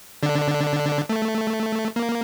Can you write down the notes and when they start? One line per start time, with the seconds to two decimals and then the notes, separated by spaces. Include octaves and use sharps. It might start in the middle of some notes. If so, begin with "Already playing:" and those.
0.23 D3 D4
1.09 A3
1.96 A#3